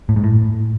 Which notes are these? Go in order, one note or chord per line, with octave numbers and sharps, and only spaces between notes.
A2
G#2
A2